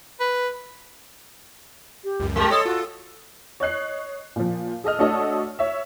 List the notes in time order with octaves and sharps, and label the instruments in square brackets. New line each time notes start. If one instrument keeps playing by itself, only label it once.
[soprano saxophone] B4
[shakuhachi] G4
[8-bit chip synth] C#2 F#2
[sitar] G#3 G4 A#4 [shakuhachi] A5
[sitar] A4 [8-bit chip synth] C#5 D#5 C6 [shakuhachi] D#6
[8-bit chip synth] F4 [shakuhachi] F#4
[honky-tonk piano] C#5 D#5 F#6 C7
A#2 F3
G#4 A4 D#5 F6
A3 D4 F#4 A4 C#5 D#5
C#5 E5